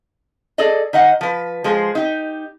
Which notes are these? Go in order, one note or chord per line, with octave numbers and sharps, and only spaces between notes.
G#4 A4 D5 D#5
D#3 D#5 F#5
F3 B4
F3 G#3 G#4 C5
D#4 G4